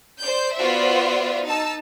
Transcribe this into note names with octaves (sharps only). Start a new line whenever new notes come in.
C5 D5 G6
B3 F4 F#4 C5 D5 E5
D#4 A5 E6